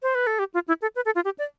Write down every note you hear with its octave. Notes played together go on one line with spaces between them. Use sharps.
C5
B4
A4
G4
F4
E4
A4
B4
A4
F4
G4
D5